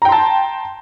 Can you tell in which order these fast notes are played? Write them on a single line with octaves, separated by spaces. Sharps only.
A#5 G5 C6 A5